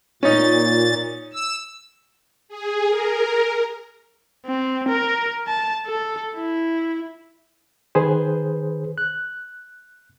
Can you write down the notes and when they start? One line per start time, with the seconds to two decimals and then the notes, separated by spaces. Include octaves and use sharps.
0.23 A#2 C#4 D#4 A6
1.33 E6
2.48 G#4
2.89 A#4
4.46 C4
4.89 A#4
5.48 A5
5.87 A4
6.35 E4
7.95 D#3 G#4 B4 C5
8.98 F#6